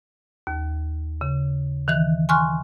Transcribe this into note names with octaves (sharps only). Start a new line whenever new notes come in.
D#2
C#3
D#3 E3 F#6
G#5 C6 C#6 F6 F#6